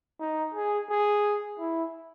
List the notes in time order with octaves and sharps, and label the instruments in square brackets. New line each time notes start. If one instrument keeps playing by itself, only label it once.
[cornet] D#4
G#4
G#4
E4